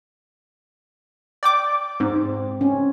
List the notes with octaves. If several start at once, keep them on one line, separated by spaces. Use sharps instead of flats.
D5 G5 D6
G#2 C4
C#4